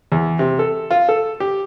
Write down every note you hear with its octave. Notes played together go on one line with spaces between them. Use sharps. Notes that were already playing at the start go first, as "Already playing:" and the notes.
E2
C3
A4
F4
A4
G4